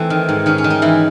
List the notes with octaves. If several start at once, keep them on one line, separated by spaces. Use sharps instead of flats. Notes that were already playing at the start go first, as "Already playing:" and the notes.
Already playing: E3 A3 C4
D#3
G#2
D#3 C#4
C#4
D#3
D#4
E3 E4